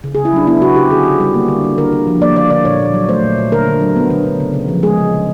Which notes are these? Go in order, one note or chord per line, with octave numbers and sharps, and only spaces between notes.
C#3
G#4
C#3
E4
F#3 D4
B3 E4
C#3 F#4
C#3 G4
D3 G#4
D3
G3
A#3
D3
D3
D3 A#4
D3
F3
A#3 D5
D3 D5
D3 D5
A#2 C#5
A#2
F#3
A3 C5
A#2
A#2
D3 A#4
D3
F#3
B3
D3
D3
C#3
C#3
F3
G#3 G#4
C#3
C#3